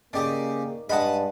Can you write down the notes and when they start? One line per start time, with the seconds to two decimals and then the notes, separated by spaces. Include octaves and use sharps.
0.13 C#3 A#3 D#4 G4 D5 D#6
0.89 G2 G3 G#3 D#5 F#5 A5 B5 D#6